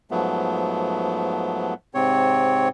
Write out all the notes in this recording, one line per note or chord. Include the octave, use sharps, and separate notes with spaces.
G#2 F3 F#3 A3 B3
G#2 C3 C4 C#5